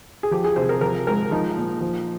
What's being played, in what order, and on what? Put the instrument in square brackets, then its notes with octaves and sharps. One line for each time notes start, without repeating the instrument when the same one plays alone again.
[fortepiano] G#4
F3 G4
G#4
C3 C5
A#4
F3 A#4
G#2 A#4
F3 D#4
A#2
F3